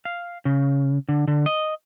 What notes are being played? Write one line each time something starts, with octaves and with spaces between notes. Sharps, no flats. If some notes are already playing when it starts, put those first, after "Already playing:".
F5
C#3
D3
D3
D#5